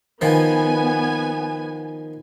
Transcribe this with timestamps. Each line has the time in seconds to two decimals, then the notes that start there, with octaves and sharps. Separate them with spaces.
0.21 D#3 F3 B3 G#5